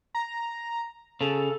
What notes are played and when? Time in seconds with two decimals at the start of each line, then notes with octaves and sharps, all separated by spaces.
0.15 A#5
1.21 C#3 A4